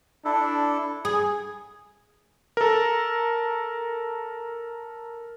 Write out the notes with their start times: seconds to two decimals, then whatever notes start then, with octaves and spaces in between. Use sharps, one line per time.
0.25 D4 E4 A4
1.05 G#4
2.57 A4 A#4